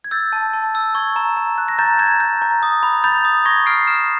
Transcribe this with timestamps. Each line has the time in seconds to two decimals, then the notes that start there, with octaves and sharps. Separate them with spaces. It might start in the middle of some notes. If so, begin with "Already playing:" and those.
0.04 G#6
0.11 E6 G6 A6
0.33 A5
0.53 A5
0.75 E6
0.95 C#6 G#6
1.16 A#5
1.36 A#5
1.58 F#6
1.68 A#6
1.78 A#5 G6 A6
1.99 A#5 G#6
2.20 G6
2.42 A#5
2.63 D#6
2.83 B5
3.04 B5 G6 A6
3.25 D#6
3.46 C#6 G#6 A#6
3.66 F6 C7 D7
3.87 F6 D7 E7